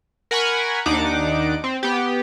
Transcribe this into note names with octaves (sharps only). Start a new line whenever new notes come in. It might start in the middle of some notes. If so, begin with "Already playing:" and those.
A#4 F#5 G#5 B5 C#6
D#2 D4 D#4 F#5 D6
C4
B3 G4